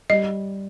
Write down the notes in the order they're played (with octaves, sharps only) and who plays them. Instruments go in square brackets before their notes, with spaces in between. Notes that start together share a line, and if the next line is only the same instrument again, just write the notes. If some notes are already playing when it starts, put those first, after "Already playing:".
[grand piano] G3 [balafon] D#5